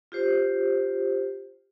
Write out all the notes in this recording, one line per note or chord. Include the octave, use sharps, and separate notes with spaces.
F4 G4 C5